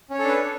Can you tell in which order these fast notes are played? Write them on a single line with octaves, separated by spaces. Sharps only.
C#4 C#5 A4 D4 B4